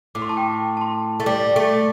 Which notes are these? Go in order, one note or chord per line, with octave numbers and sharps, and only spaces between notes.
A2 D6
C6
A5
G5
A5
C6
A3
G3 D6
A3 D6